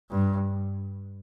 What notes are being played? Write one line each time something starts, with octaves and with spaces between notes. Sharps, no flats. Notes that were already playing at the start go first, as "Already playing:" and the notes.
G2